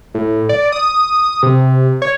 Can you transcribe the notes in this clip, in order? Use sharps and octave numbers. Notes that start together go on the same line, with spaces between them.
A2
D5
D#6
C3
C#5